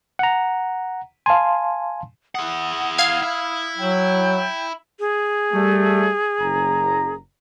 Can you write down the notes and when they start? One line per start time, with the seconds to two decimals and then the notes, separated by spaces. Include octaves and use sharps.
0.19 F#5 A#5
1.26 F5 G#5 A5 C6
2.35 E4 F#5 D#6
2.98 F5 F6 G#6
3.22 E4
3.78 F#3 G5
5.00 G#4
5.53 G3 A3
6.41 F#1 A#5